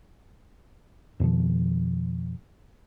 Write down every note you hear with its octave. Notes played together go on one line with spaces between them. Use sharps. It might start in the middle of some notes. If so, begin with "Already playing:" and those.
F2 B2 D#3 F3